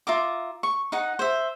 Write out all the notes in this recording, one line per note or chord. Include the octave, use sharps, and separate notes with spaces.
F4 E5 A#5 D6
C#6
D#4 F#5
C5 E5